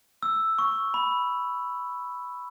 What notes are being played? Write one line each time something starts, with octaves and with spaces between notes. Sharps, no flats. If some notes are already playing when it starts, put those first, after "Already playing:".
E6
C#6
B5